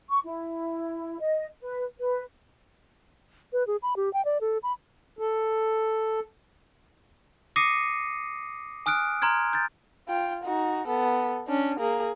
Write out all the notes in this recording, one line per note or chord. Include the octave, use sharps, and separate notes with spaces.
C#6
E4
D#5
B4
B4
B4
G#4
B5
G4
G5
D5
A4
B5
A4
D6 D#6 A#6 C7 C#7 D#7
G#5 D#6 F6 F#6 D7
A#5 C6 F6 G#6 D7
G6 A6
F4 G5
D#4 F#4
B3 A4
C#4 D4
A#3 G#4